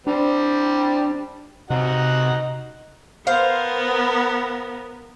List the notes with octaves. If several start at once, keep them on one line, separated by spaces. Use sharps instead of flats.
G3 C4 D4
C3 D#4 F#4 F#5
B3 A#4 C5 F5